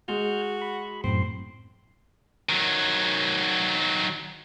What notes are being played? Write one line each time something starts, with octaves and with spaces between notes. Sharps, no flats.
G#3 F#4 F6 G6
B5
F#2 A2 C4 C6
D#3 F#3